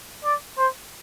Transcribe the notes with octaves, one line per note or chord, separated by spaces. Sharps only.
D5
C5